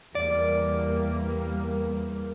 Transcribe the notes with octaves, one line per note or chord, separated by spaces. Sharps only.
E2 G3 A#3 D5